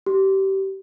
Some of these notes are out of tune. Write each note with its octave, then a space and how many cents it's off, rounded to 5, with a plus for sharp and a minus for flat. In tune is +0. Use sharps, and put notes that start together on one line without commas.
G4 -25